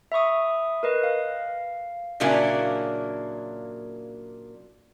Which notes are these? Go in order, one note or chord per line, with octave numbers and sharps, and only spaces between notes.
E5 B5 C#6 D#6
A#4 B4 D#5
F5
A#2 C#3 F#3 A#3 D4 E4